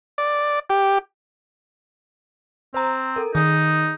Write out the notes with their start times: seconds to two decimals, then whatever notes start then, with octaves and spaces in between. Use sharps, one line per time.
0.18 D5
0.70 G4
2.74 C4 C5 A#5
3.16 A4 A#4
3.35 D#3 D#4 G#4 D#6